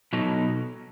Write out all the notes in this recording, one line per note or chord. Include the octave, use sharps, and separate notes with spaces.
B2 F#3 B3 D#4 A4